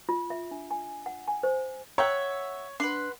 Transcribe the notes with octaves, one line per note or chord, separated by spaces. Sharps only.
F4
E5
D4
G#5
F#5
G#5
C5
C#5 E5 F#5 G5 A#5
D4 B4 F#5 C6